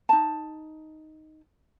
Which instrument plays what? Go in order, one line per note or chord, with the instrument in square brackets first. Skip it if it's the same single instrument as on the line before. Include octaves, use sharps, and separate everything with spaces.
[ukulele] D#4 A5